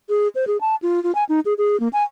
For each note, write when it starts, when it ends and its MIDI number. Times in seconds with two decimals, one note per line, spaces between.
0.09 0.28 68
0.35 0.45 72
0.47 0.57 68
0.61 0.75 81
0.82 1.02 65
1.04 1.14 65
1.15 1.24 80
1.29 1.40 63
1.46 1.54 68
1.58 1.79 68
1.80 1.88 58
1.93 2.03 80